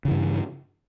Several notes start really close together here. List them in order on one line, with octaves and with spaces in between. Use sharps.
C#3 E3 G2